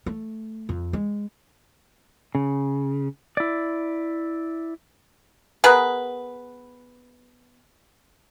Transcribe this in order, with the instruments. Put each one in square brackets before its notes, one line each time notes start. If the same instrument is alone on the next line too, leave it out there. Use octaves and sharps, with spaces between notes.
[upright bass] A3
F2
G#3
[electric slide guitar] C#3
E4 D5
[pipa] B3 G#4 A#4 B4